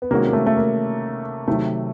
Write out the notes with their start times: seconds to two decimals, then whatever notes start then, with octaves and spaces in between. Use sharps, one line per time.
0.02 B3
0.11 C3 D#3 G#3 A#3 C#4 F#4
0.27 A#3
0.33 A3
0.46 A3
0.57 A#3
1.48 C3 D#3 F#3 A3